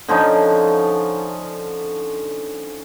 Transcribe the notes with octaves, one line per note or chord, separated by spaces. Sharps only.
D3 F3 C#4 D#4